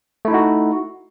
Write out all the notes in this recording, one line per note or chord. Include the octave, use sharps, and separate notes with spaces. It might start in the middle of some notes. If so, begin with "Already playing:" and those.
A3 D#4 E4 F#4